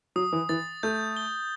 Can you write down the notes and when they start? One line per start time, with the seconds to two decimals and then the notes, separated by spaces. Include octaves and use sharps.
0.16 F#3 D#6
0.33 E3
0.49 E3 A6
0.83 A3 G6
1.17 G7